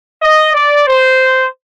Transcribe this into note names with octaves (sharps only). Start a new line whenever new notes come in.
D#5
D5
C5